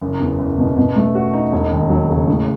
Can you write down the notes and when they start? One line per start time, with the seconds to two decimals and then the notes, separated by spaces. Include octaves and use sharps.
0.01 F#1
0.20 E2
0.39 F#1
0.58 B2
0.77 B2
0.96 A3
1.15 F#4
1.33 D#4
1.52 E1
1.71 D#2
1.90 F#3
2.09 C#3
2.28 A2